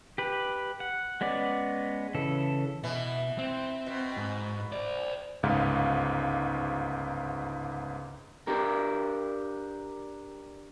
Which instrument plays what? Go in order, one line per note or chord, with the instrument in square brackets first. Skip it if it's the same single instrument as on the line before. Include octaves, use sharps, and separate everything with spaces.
[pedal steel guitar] G4 B4
F#5
G#3 B3 C#4 D5
C#3 E3 A4
[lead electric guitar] B2 [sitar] E3
[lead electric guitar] C4
[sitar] B2
[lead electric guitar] G#2
C5 D5
[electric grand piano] G1 C#2 G#2 F5
[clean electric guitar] D4 G4 A#4